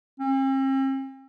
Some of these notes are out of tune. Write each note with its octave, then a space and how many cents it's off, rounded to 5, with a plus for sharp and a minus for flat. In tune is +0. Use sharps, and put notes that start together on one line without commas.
C4 +45